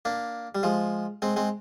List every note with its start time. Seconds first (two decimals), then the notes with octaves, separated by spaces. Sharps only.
0.05 A#3 D4
0.55 G3
0.63 F3 G#3
1.22 G#3 C4
1.36 G#3 C4